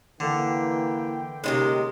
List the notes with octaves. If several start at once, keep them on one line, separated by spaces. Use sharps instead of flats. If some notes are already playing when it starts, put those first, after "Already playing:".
D3 E3 A#3 G5
C3 F3 G#3 A#3 C#4 D#4